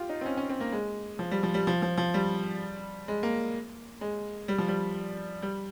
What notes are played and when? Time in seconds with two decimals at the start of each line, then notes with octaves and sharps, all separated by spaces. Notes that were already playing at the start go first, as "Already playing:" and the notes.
Already playing: F4 G4
0.09 D#4
0.21 C4
0.26 C#4
0.37 C#4
0.49 C4
0.60 A#3
0.72 G#3
1.19 F3
1.31 G3
1.43 F3
1.54 G3
1.67 F3
1.82 F3
1.97 F3
2.14 G3
3.08 G#3
3.23 A#3
4.01 G#3
4.48 G3
4.58 F3
4.68 G3
5.42 G3